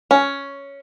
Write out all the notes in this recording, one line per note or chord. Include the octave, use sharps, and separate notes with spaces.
C#4